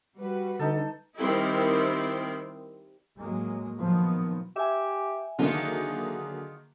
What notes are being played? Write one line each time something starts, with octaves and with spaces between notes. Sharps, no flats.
G3 F#4 B4
D3 D#4 A4
D#3 G3 C4 E4
A2 F#3 G#3 A#3
A#2 D#3 F3 F#3 B3
G4 E5 G#5
D3 D#3 F#3 A#3 F4 G#4